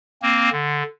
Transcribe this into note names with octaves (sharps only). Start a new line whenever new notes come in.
A#3 C4
D3